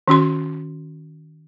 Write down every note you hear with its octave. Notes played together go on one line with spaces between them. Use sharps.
D#3 C#4 F#4 C6